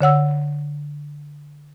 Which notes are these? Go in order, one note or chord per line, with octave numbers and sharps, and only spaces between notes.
D3 C#5 F#5 E6